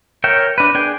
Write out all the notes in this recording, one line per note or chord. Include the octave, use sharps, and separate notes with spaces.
A#4 C#5 E5 G5
D4 B4
D4 G#4 G5